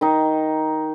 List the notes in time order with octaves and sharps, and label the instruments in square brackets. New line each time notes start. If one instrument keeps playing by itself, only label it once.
[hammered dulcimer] D#3 D#4